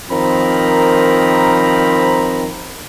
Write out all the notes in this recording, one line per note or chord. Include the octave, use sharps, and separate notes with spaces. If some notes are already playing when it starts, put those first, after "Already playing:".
D#3 F3 C4 A#4 A#5 B5